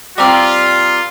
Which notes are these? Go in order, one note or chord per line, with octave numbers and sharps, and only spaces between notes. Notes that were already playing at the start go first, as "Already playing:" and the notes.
G3 C4 F4 G4 A#4 D5